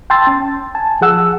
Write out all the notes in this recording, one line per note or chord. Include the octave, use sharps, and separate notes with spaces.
G5 A5 C6 E6 A6
C#4
G#5 A5
F3 G#4 F#5 E6